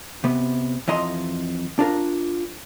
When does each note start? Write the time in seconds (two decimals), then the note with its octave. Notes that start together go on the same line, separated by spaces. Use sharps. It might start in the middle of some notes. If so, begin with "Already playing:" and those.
0.24 C3 B3
0.88 F2 E3 D#5 A#5 C6
1.79 D4 F4 A#4